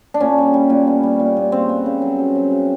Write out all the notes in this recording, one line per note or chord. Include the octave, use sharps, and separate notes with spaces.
D4
A#2 C#4
G3
G3
A#2
B3
G3
A#2
A#2
C#3 C4
B3
C#3
F#3
C#3
F#3
C#3